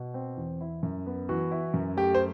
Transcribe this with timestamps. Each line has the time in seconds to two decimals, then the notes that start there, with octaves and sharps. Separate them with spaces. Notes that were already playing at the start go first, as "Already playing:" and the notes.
Already playing: B2
0.14 C4
0.37 E2
0.61 E4
0.83 F#2
1.06 B3
1.29 E3 F#4
1.51 E4
1.74 F#2
1.97 A3 G4
2.15 C5